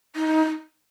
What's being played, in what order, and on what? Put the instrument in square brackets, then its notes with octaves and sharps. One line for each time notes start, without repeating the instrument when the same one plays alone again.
[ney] D#4